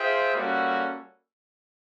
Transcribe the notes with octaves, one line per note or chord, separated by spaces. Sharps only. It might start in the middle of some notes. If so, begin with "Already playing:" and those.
Already playing: F4 G#4 C5 E5 G5
G3 A#3 C#4 F#4 A4